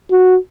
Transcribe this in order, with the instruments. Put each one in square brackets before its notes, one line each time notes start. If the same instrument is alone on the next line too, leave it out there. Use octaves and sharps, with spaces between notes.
[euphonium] F#4